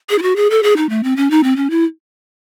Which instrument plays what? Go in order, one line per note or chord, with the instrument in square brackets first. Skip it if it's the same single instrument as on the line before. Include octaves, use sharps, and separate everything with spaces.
[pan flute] G#4
E4
F#4
G#4
A4
G#4
D#4
A3
C4
C#4
D#4
C4
C#4
E4